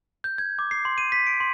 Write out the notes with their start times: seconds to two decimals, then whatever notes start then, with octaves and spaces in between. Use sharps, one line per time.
0.24 G6
0.38 G#6
0.59 D6
0.71 C7
0.85 C6
0.98 D#7
1.12 B6
1.27 D7
1.40 C6